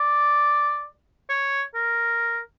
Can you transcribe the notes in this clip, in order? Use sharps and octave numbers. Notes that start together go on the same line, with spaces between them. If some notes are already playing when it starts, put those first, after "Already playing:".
Already playing: D5
C#5
A#4